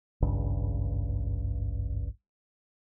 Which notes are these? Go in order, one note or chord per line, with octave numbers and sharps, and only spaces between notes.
G#1 C#2 G2 C#3